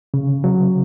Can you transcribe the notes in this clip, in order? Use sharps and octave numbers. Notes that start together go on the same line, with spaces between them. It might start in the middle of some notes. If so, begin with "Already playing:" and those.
C#3
F#3